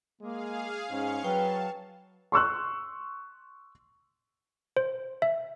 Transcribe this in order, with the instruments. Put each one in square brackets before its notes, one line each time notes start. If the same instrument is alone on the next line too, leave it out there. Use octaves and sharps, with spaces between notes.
[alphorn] G#3 [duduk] A#3 [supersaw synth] G#4 F5
[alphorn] G#2 [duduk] C#4 [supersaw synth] F5 C#6
[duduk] F#3 [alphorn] B4 [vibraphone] G5 [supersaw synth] A5
[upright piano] C6 C#6 E6 F#6
[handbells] C5
E5